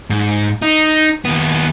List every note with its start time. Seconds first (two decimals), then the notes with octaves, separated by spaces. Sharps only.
0.10 G#2
0.62 D#4
1.25 D#2 B3